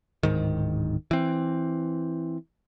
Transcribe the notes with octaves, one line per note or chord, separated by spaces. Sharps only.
D1 G#2 D#3
E3 C4